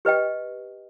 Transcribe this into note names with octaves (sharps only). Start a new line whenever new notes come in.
G4 B4 D#5 G5